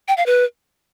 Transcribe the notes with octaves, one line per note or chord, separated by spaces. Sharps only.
G5
F5
B4